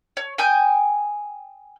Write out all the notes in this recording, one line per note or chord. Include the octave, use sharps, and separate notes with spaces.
C#5
G5 G#5 D#6 G6